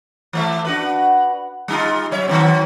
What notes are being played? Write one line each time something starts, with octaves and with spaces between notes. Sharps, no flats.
E3 A3 E5
D4 F#4 B4
G3 D#4 F4
F#3 C#5 E5
D#3 F#3 C4